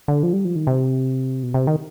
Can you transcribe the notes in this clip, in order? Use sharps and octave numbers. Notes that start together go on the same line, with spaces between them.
D3
F3
G3
F3
D#3
C3
B2
C3
D#3